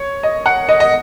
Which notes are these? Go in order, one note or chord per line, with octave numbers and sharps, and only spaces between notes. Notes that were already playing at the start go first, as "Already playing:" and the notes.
Already playing: C#5
D#5
F#5
D#5
D#5